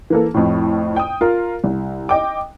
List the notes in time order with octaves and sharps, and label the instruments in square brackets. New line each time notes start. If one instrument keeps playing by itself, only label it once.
[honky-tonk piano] E3 A#3 A4
F2 A2
G5 D#6
F4 A#4
C2
D#5 G5 D6